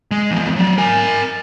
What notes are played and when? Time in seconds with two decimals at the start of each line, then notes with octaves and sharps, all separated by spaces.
0.11 G#3
0.31 E2 F3
0.56 F#3 D5
0.78 A#4 G#5